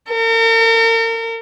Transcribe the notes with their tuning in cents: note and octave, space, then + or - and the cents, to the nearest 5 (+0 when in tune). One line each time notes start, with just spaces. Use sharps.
A#4 -40